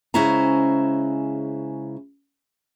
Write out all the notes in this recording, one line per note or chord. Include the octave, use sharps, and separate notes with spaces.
C#3 G#3 C#4 E4 C5 A#5